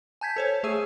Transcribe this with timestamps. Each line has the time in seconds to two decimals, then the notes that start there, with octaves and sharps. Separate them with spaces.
0.21 G#5 A5 G6 G#6 B6
0.36 A4 C5 C#5
0.63 A3 G#4 E5 E6 D#7